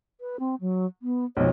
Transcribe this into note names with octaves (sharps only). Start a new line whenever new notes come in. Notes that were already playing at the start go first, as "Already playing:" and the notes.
B4
C4
F#3
B3
B1 F2 C#5